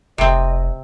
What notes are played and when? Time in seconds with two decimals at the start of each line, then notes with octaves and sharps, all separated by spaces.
0.18 F1 C3 C4 D#5